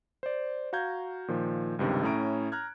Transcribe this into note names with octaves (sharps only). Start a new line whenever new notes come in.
C5 D5
F#4 F5 A#5 G6 G#6
A#2 D#3 F3
C#2 G2 C3 D#3
A2 C#4 E4 A#5 D#6 D7
A#5 F6 F#6 G#6